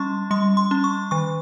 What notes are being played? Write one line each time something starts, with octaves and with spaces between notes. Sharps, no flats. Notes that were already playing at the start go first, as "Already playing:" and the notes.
Already playing: G3 C#4 C6 C#6
G3 C6
C6
C#4
C#6
D#3 C#6